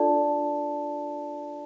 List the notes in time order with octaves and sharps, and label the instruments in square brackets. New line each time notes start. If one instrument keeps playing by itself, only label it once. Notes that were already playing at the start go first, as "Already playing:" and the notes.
Already playing: [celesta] D4 F4 A4 D5 A5